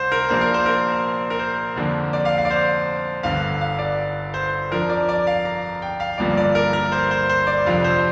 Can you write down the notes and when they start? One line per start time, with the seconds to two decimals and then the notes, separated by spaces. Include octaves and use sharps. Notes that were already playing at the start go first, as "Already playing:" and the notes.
Already playing: C2 C5
0.12 A#4
0.29 A#1 A#2 A#3 D4 C5
0.41 A#4
0.54 C5
0.66 A#4
1.30 A#4
1.39 C5
1.76 F2 D3 A#3 D4
2.13 D5
2.25 F5
2.38 F5
2.45 D5
2.50 C5
3.23 G1 G2 D3 F5
3.61 F5
3.79 D5
4.34 C5
4.71 F2 F3 D4 A#4
4.90 D5
5.09 D5
5.27 F5
5.45 A#5
5.82 G5
6.00 F5
6.18 G1 G2 F3 A#3 D5
6.37 D5
6.55 A#4
6.73 A#4
6.92 C5
7.11 C5
7.29 C5
7.47 D5
7.65 F1 F2 F3 D4 F5
7.84 C5